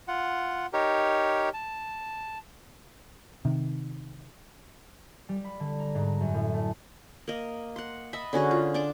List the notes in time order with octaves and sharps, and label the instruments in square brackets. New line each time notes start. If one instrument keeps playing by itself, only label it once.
[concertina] F4 F#5
D#4 G4 A#4 C#5
A5
[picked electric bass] C3 D#3
[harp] G3
B5
D3
A#5
G#2
F#2
A2
A3
[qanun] A#3 D#5
F#5 C6
D#5 E5 A5 B5
D3 C#4 F#4 G#4
F4
D4 A5 C6 D6